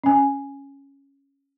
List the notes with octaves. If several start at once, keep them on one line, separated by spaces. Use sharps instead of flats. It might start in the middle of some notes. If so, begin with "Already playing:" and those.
C#4 G#5